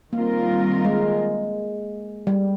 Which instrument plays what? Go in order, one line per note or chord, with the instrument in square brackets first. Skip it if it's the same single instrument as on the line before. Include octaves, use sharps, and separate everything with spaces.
[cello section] D#3 G3 C4 F4 A#4 [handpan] A#3
[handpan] G#3
G3